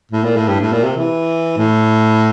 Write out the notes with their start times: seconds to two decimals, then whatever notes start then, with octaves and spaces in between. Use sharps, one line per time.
0.12 A2
0.24 A#2
0.36 A2
0.48 G2
0.61 A2
0.72 A#2
0.84 C3
0.97 E3
1.57 A2